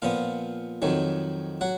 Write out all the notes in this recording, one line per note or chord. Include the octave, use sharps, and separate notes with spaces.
A#2 F3 B3 F5
F2 D#3 F#3
F#3 F#5